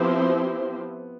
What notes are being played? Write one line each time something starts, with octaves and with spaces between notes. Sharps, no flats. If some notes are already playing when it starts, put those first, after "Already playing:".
Already playing: F3 B3 C4 E4 G4 C5